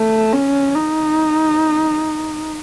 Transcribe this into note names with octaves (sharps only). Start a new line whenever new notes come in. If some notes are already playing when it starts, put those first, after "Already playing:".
Already playing: A3
C#4
D#4